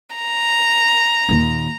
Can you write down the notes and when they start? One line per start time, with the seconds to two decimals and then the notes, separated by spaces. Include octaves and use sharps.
0.16 A#5
1.29 D#2 A#2